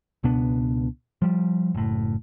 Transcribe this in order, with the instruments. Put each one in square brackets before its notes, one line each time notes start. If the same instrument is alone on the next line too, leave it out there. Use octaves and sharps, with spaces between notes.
[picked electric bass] C#2 B2 B3 D4
F3 G3
F#1 A2